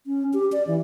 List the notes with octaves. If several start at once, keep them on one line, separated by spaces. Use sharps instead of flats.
C#4
G4
D5
E3